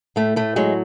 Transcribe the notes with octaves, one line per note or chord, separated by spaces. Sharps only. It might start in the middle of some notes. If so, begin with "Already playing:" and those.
A2 A3
A2 A3
F#3 G#3